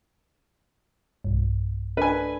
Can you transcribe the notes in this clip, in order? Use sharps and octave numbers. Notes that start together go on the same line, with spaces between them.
B1 G2
D4 A4 B4 G#5